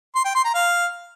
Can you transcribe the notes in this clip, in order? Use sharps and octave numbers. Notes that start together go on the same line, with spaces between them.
C6
G5
C6
A#5
F5